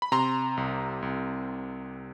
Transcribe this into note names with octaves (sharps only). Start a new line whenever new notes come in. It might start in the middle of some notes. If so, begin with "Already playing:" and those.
B5
C3 A#5 C6
C2
C2